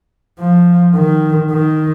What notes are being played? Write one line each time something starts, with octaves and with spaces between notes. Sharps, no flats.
F3
D#3
D#3